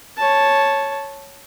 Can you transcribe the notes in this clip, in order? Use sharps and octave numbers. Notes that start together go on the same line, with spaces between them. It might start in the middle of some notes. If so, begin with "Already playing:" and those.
C#5 A5